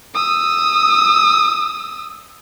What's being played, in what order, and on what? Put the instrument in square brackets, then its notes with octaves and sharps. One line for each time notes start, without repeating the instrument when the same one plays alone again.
[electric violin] D#6 E6